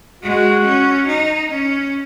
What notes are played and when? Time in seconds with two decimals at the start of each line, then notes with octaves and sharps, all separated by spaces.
0.23 G#3 F#4
0.66 C#4
1.08 D#4
1.51 C#4